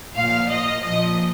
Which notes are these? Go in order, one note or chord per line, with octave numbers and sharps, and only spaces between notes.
A#2 F3 F5
D#5
A#2 F3 D#5